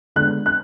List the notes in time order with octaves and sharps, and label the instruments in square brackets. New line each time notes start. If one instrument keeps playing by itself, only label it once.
[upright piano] D3 G#3 B3 D4 F#6
F#6